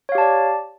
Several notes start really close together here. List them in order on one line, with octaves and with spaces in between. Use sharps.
C#5 F5 G4 A5 D5